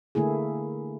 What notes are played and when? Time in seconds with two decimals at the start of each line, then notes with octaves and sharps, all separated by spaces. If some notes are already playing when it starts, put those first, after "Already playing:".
0.15 D3 A3 A#3 E4 G#4